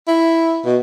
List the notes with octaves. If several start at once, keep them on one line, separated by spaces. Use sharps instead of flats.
E4
B2